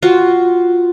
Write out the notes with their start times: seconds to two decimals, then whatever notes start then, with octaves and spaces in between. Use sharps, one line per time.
0.03 F4 F#4